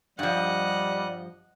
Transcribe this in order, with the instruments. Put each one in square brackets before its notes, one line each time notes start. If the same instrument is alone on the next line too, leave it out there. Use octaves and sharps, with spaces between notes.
[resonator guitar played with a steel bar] G2 F3 [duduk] G3 [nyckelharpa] D#5 F#5